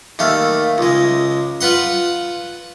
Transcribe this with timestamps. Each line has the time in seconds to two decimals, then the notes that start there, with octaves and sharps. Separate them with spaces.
0.19 D#2 A3 F5
0.78 C#2 G#3
1.61 F4 B4 F#5 C6